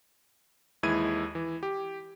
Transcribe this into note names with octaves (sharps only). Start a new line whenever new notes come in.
D#2 E3 G#3 E4 G#6 D#7
E3
G4